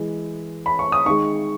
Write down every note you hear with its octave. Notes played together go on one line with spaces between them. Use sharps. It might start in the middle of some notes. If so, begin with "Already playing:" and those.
Already playing: E3 G#3
B5
C#6
D#6
D#3 G#3 C#6